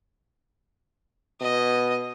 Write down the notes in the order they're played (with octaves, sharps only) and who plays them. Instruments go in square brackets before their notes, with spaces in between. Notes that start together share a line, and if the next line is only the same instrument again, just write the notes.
[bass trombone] B2 [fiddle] D#5